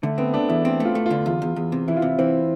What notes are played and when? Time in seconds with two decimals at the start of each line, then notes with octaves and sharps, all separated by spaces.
0.03 D3 A3
0.18 B3 C4
0.33 A3 D4
0.49 E2 E4
0.64 C4 E4
0.80 A3 F4
0.95 A3
1.06 D3 F4
1.26 E2 F4
1.42 E2
1.56 E2
1.72 C3
1.88 E3 E4
1.97 F4
2.02 C3 E4
2.19 E3 C4